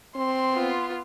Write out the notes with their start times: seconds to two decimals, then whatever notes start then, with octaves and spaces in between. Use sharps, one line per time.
0.16 C4 C6
0.53 B3 F4